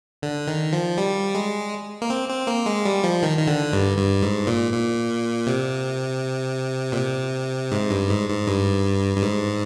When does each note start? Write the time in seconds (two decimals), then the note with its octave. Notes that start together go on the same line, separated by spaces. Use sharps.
0.22 D3
0.48 D#3
0.73 F3
0.98 G3
1.35 G#3
2.02 A#3
2.10 C4
2.29 C4
2.47 A#3
2.66 G#3
2.85 G3
3.04 F3
3.22 D#3
3.37 D#3
3.47 D3
3.73 G2
3.97 G2
4.23 G#2
4.47 A#2
4.72 A#2
5.47 C3
6.92 A#2
6.97 C3
7.71 G#2
7.91 G2
8.09 G#2
8.29 G#2
8.47 G2
9.17 G2
9.22 G#2